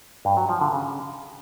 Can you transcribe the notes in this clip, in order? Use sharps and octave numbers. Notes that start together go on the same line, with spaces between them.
G2
F#3
F3
D3
C#3